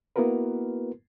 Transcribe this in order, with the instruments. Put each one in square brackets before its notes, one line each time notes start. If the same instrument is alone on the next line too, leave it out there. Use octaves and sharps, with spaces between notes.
[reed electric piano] A#3 B3 E4 F#4 A#4 B4